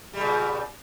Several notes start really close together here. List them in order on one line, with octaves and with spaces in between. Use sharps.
G3 C#3 A#2